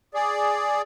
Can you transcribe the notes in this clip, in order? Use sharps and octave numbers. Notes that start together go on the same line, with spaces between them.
G#4 D5